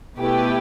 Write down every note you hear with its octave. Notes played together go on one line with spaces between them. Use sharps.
B2 A3 E4 G4 B4